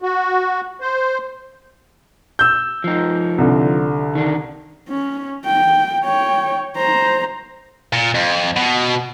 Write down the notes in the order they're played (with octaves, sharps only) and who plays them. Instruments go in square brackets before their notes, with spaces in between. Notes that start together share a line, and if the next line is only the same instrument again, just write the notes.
[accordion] F#4
C5
[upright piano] E6 G6
[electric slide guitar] F3 D#4
[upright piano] C2 D3
[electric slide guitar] D#3 D4
[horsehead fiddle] C#4
G5
C#5 G5
C5 A#5
[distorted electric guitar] A#2
F2
B2